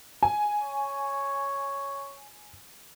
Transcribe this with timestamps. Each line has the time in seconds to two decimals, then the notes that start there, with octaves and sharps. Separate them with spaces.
0.23 G#5
0.61 C#5